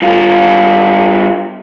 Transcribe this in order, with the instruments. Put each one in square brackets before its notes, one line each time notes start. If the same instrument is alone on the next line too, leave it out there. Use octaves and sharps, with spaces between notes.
[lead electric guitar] G2 F4